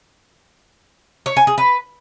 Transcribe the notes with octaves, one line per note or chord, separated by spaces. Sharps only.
C#5
G#5
G#4
B4